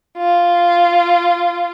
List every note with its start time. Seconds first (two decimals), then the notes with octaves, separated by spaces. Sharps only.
0.18 F4